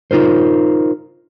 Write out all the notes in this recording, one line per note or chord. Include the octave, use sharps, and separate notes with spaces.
D#4 F4 A#4 C5